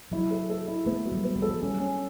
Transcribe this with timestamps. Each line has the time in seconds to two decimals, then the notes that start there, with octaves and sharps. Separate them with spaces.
0.12 F#3 E4
0.31 A4
0.50 A4
0.68 E4
0.86 A3 B3
1.05 F#3
1.12 G3
1.24 B3
1.36 G3
1.42 A4
1.49 F#3
1.61 G3 C#4
1.80 C#4